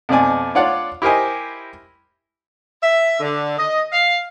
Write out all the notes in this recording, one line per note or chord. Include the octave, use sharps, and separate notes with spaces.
F2 B2 C4 D5 G#5
D4 F4 C#5 D5 F#5
E4 G4 A#4 C5 D#5 G#5
E5
D3
D#5
F5